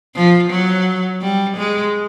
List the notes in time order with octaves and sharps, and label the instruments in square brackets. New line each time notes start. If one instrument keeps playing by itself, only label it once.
[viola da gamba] F3
F#3
G3
G#3